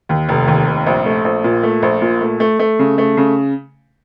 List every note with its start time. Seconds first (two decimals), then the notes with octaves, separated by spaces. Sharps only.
0.09 D#2
0.29 F1
0.48 D#2
0.67 F1
0.87 A#1
1.05 A3
1.24 A#1
1.44 A#2
1.63 A3
1.82 A#1
2.02 A#2
2.21 A3
2.40 A3
2.59 A3
2.79 C#3
2.98 A3
3.17 C#3